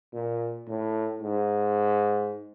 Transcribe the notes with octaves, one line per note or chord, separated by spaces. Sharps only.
A#2
A2
G#2